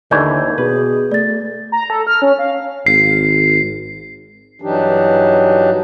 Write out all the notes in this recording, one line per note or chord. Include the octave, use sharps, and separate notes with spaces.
D#2 D3 E3 A3 D5 G6 G#6
B2 G#4 B4
A3 D5 A6
A#5
A4
F6
C#4
F5
G#1 C7
G2 E3 F#3 D4 D#4 G4